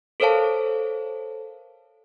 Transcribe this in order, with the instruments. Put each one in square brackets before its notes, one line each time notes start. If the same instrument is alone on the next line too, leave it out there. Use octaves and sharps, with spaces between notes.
[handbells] A4 A#4 C5 C#5 F5 A5